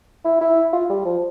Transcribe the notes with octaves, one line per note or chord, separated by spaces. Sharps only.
E4
E4
F4
G3
F3